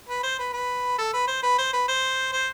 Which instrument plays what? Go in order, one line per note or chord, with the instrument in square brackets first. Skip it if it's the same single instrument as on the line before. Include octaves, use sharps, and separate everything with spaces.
[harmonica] B4
C5
B4
B4
A4
B4
C5
B4
C5
B4
C5
C5